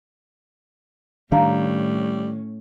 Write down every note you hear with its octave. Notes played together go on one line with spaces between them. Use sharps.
A2 D#3 G3 C#4 D4 F5 A#5